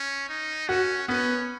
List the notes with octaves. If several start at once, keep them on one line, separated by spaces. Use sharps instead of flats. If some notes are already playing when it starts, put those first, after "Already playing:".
Already playing: C#4
D#4
C#4 F#4
B3 C#4